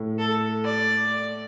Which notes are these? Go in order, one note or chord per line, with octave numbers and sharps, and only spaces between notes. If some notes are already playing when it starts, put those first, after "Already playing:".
Already playing: A2
A4
D5